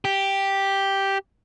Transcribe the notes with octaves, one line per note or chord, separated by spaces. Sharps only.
G4